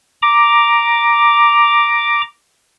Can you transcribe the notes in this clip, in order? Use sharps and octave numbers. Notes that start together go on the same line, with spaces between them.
A#5 D6